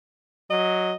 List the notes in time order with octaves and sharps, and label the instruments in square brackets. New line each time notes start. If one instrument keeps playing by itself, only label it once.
[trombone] F#3 [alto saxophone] D#5